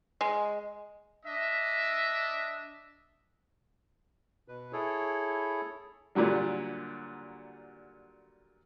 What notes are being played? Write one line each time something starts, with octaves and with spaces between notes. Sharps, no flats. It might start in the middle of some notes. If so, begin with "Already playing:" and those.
G#3
D4 D#5 E5
B2 B4
E4 G#4 A4 C#5
A#2 D3 F#3 G3